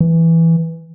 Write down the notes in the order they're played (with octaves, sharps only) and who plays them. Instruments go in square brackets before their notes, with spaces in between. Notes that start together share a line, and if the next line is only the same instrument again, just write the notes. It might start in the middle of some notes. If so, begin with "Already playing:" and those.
[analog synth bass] E3